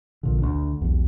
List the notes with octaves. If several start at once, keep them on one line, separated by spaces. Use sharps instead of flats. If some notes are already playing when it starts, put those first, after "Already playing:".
A#1 A#2 D3
D2 D4
B1 E2